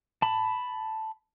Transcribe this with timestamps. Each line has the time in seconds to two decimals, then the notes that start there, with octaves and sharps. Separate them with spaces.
0.22 A5 B5